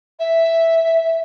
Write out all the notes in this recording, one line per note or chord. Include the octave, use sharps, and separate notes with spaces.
E5